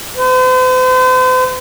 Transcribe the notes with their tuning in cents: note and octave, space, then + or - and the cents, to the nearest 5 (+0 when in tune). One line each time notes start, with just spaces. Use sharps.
C5 -45